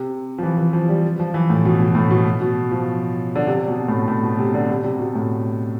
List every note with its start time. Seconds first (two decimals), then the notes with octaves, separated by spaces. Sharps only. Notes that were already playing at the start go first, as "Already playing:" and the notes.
Already playing: C3
0.38 F3
0.43 E3
0.58 E3
0.73 F3
0.89 G3
1.20 F3
1.34 E3
1.50 A2
1.65 B2
1.80 B2
1.95 A2
2.11 B2
2.41 B2
2.71 F3
3.36 D3
3.47 C3
3.68 B2
3.88 A2
4.08 A2
4.23 B2
4.39 C3
4.54 D3
4.69 C3
4.84 C3
4.99 B2
5.15 A2